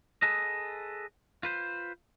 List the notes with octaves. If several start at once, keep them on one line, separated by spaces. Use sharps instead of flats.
G#4 A4 B4 D#5
F4 B4 C5